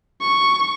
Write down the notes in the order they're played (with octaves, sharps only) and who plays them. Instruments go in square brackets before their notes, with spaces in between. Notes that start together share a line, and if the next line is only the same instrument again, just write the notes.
[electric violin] C#6